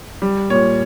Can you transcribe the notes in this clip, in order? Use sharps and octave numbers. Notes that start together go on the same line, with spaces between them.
G3
A#2 C#5